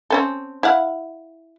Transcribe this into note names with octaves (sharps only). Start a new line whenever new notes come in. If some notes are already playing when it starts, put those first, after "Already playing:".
C4 C#4 A4
E4 F5 F#5